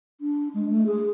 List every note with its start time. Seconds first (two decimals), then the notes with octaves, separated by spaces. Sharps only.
0.21 D4
0.54 G#3
0.70 A3
0.86 G#4